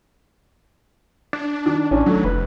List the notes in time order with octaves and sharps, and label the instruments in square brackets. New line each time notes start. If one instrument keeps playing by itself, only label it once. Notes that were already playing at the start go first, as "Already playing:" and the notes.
[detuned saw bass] D4
[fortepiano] D#3
[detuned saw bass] A1 [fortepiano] C#4 D4
[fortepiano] D#3 A3 [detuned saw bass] F#3
[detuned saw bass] F1 [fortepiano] B4